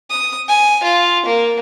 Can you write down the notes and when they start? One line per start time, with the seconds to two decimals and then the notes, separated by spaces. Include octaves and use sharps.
0.10 D#6
0.48 G#5
0.83 F4
1.25 A#3